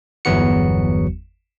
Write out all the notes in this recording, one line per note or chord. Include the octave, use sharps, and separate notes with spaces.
G1 E2 F#3 B3 F#4 C#7